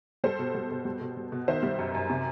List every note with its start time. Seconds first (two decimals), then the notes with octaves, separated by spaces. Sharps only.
0.24 G3 A4 C5
0.39 B2
0.55 G3
0.71 B2
0.85 G3
1.01 B2
1.17 G3
1.32 B2
1.48 D#3 C5 E5
1.63 G3
1.79 F#2
1.95 F#2
2.10 C3